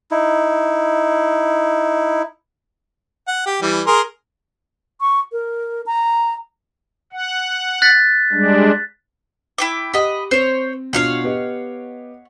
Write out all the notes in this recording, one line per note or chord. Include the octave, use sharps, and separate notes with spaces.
D#4 E4
F#5
G4
E3 G3
G#4 A#4 C6
C#6
A#4
A#5
F#5
F#6 A6 B6
G3 G#3 D4
E4 G5 D6
G4 D#5 F#5 B5
C4 C5 C#5
B2 D4 F4 C#5 F5 F#5
B3 G4 D#5